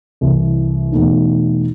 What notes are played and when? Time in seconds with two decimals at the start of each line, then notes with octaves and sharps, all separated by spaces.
0.21 C2 C3 E3
0.92 E2 B2 A3 D#4